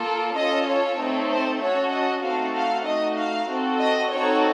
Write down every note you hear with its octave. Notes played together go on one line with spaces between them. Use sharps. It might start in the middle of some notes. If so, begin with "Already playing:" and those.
Already playing: A#3 F4 A4
C#4 F4 A4 D#5
C#5
A3 C4 D#4 A4
C5
C#4 F#4 A4 C#5
D#5
A3 C4 D#4 F#4 A4 F5
F5
A3 D#4 F#4 D#5
F5
C4 F#4 A4
D#5
C4 D#4 F#4 A4 C#5